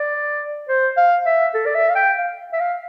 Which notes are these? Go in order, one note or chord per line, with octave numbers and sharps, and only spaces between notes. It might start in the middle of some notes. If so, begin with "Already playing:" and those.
Already playing: D5
C5
F5
E5
A4
D5
E5
F5
G5
F5
E5
F5